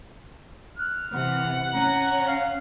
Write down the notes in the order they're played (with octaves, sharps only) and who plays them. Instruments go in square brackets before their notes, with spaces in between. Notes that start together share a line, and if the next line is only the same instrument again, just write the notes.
[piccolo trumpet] F6 [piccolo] F#6
[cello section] C3 E3 [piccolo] F#5
[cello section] C#4 [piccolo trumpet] A#5
[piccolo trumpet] F5